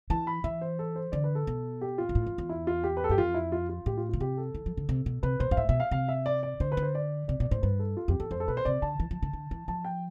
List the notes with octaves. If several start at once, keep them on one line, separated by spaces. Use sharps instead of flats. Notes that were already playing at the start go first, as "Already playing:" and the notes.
E3 A5
B5
E3 E5
C5
A4
C5
D3 D5
B4
A4
B2
G4
F4
B2
A2
F2
E2
E4
F4
G4
B4
A4
G2 G4
F2 F4
E4
F4
F4
A2 G4
F4
D3 F4
C3 G4
A4
E3
F3
D3
C3
B2
C3 B4
B2 C5
G2 F5
A2 E5
B2 E5
F5
C3 F5
E5
D5
D5
D3 C5
B4
D3
C5
D5
C3 D5
B2 D5
A2 C5
G2 B4
A4
F4
F2 G4
E2 A4
F2 C5
A4
B2 B4
C5
C3 D5
D3 A5
E3
F3
D3
D3
E3
F3 A5
G5